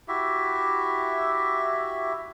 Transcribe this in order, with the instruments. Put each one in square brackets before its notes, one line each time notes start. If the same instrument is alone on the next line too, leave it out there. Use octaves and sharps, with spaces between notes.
[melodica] E4 F#4 G4 E5